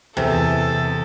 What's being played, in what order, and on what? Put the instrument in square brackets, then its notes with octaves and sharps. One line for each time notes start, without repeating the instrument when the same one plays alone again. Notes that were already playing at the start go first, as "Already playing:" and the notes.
[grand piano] E2 [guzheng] C3 [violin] A4